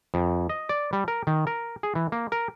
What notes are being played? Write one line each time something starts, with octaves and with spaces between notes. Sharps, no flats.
F2
D#5
D5
G3
A#4
D#3
A#4
G#4
E3
A#3
A#4